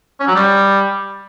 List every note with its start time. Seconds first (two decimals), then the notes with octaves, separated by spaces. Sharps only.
0.20 C#4
0.28 F#3
0.35 G3